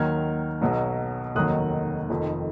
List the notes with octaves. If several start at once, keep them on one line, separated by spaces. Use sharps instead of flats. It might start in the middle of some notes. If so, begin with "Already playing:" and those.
Already playing: D#2 D#3 F#3 F6 G#6
B1 B2 F#3
F1 D#2 D#3 F#3 D#6 F#6
F1 F2 D#3